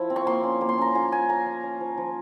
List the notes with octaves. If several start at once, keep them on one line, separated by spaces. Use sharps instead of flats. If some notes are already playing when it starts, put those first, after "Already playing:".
Already playing: F3 E4
C4
C#6
A#3 C6
C#4
A#3
C6
C#4 A#5
F4 G#5
A#3 G#5
C#4 A#5
C#4
C#4
F3
F3